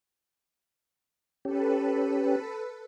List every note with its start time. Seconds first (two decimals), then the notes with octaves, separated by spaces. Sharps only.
1.45 C#4 G4 A4 B4